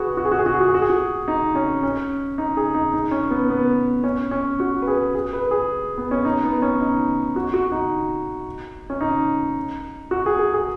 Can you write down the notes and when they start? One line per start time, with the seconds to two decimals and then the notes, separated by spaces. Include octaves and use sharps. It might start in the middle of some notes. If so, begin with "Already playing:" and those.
Already playing: F#4 G#4 B4
0.17 F#4
0.25 G#4
0.32 F#4
0.39 G#4
0.46 F#4
0.54 G#4
0.61 F#4
0.68 G#4
0.74 F#4
0.82 G#4
0.90 F#4
1.28 D#4
1.55 C#4
1.83 C#4
2.38 D#4
2.57 G#4
2.74 D#4
2.93 D#4
3.11 C#4
3.30 B3
3.50 B3
4.04 C#4
4.31 C#4
4.60 F#4
4.82 B4
4.87 G#4
5.15 G#4
5.33 B4
5.51 G#4
5.98 B3
6.11 C#4
6.25 D#4
6.44 B3
6.62 C#4
6.80 D#4
7.36 F#4
7.54 F#4
7.72 D#4
8.90 C#4
9.01 D#4
10.11 F#4
10.26 G#4
10.39 G#4
10.54 G#4